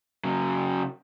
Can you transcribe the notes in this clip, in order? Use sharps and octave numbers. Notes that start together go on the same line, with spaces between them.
C#3 F#3